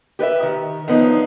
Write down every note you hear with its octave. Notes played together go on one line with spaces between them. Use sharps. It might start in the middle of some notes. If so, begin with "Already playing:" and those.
G4 B4 D5 E5
D#3
F#2 F3 B3 D4 D#4